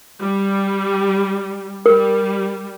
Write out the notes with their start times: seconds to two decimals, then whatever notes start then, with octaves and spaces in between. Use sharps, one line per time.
0.20 G3
1.86 G3 A#4